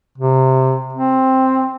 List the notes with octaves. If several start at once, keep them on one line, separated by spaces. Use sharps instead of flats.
C3
C4